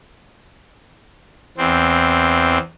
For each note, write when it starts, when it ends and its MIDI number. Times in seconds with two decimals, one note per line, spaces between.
1.58 2.58 40
1.58 2.58 60